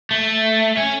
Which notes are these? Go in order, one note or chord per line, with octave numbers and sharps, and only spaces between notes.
A3
C#4